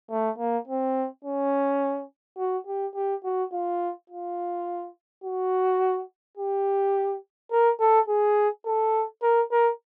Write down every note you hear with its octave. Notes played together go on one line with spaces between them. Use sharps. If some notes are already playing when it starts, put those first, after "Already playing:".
A3
A#3
C4
C#4
F#4
G4
G4
F#4
F4
F4
F#4
G4
A#4
A4
G#4
A4
A#4
A#4